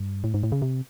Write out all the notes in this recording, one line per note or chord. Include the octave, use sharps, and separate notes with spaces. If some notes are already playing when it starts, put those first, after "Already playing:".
Already playing: G2
A2
G#2
A2
C#3
C3